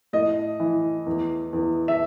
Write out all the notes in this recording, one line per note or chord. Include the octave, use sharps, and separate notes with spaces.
A2 D#5
E3
E2
E2
E5